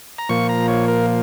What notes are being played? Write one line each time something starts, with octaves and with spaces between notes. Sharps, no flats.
A#5
A#2 F3 A#3 C#6
A#5
C#5
A#4